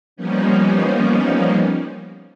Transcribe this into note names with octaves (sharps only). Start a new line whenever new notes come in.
F3 G3 A#3 B3 C#4 D#4